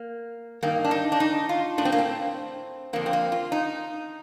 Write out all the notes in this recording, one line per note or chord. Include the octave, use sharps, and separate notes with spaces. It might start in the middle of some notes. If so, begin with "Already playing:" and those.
Already playing: A#3
G2 D#3 A#3
D4
D#4
D4
D#4
F4
A2 D4
C4
A#3
C4
F2 D3 A#3
C4
A#3
F4
D#4